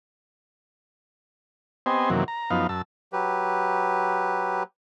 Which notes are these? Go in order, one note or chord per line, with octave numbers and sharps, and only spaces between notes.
B3 C4 G4 C5 D#5 G#5
F#2 C3 D#3 E3 F#3 A#3
A#5
F#2 F3 B3 D#4 F5
F#2 A5 E6
F#3 G4 B4